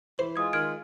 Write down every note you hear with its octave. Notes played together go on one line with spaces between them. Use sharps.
E3 C5
G#3 F4 D#6 G#6
D#3 F6 G#6 D7